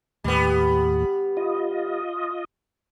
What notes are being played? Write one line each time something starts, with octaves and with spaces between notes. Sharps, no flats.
D#2 A2 G3 B3
F4 D#5